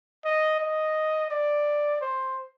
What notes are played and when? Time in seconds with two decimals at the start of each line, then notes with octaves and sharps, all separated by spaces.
0.25 D#5
0.60 D#5
1.31 D5
2.01 C5